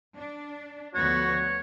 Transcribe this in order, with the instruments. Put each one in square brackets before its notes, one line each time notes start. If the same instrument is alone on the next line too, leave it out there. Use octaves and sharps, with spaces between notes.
[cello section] D4
[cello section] D2 F3 B3 [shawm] F#4 [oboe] C#5